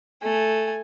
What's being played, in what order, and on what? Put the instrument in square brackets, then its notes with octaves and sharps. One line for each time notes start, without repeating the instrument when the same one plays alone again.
[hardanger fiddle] A3 G#5